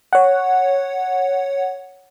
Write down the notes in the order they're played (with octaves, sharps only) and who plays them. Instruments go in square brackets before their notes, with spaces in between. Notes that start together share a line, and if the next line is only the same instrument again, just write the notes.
[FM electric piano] C#5 F#5